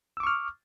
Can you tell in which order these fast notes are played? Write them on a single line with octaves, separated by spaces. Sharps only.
E6 D6 C#6 F6